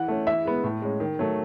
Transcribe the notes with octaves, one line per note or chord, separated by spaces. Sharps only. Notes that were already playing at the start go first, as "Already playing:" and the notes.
Already playing: E3 F#5
A3 C#4
E3 E5
G#3 B3
A2
G#3 C#4
D#3
F#3 A3